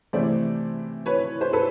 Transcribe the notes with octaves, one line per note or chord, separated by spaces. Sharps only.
C3 E3 A3 C5 D5
B4 C#5
C5
A4 B4